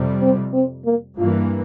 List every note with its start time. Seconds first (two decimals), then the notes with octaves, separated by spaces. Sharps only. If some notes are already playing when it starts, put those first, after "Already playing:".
Already playing: F2 C3 G3
0.22 C4
0.53 C4
0.85 A#3
1.18 G2 E3 A#3 F4